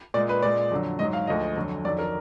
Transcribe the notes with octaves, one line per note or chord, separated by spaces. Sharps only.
A#2 G#3 D5
B4
A#2 G#3 D5
F2 D3 F#3
G#2 F#3 D#5
F5
D2 D3 F3 G#3 D#5
F2 D3 F#3
F2 D#3 F#3 D5
A#4